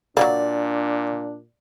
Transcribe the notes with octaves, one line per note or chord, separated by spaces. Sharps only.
A#2 F#3 G3 A#3 D4 D5